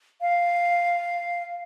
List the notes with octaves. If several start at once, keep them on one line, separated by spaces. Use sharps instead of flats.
F5